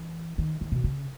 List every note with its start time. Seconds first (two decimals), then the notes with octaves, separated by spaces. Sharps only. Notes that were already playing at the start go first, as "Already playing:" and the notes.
Already playing: E3
0.38 D#3
0.61 D#3
0.72 B2
0.84 C#3